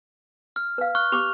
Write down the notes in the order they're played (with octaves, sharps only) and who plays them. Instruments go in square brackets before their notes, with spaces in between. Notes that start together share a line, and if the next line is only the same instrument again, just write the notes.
[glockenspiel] F6
[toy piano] B4 F5
[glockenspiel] C#6 F6 F#6
[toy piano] G4 C#6 D6 [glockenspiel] F7